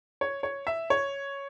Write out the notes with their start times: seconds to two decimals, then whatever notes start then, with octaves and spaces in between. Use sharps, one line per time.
0.21 C#5
0.43 C#5
0.67 E5
0.90 C#5